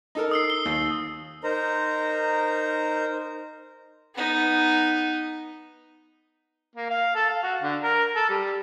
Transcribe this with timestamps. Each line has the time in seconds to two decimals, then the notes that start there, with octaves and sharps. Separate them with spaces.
0.15 D#4 A4 A#4
0.31 D#6 E6 C7
0.50 G7
0.65 D#2
1.44 D#4 A#4 C5 A#5
4.15 B3 D#4
6.76 A#3
6.90 F5
7.15 A4
7.30 F5
7.43 F#4
7.62 D3
7.83 A#4
8.16 A4
8.29 G3